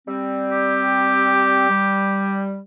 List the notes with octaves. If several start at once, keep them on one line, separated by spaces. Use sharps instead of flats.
G3 C4
G4
G3